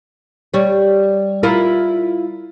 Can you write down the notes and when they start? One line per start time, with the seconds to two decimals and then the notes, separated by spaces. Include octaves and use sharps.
0.54 G3 C#5
1.43 E4 F4 A#4